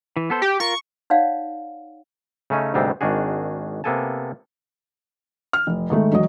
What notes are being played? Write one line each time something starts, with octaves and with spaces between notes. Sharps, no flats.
E3
B3 A4 C5
G4 G5
F4 A#4 C#6
D#4 C#5 D5 F5 F#5
C#3 A3 C#4 D#4
D2 G#2 C3 G3 B3 C4
G#1 D#3 D4 F#4 G#4
C3 A#3 B3 A4 G#5 A5
F6
F1
G#2 D#3 A3
E1 F#3 D#5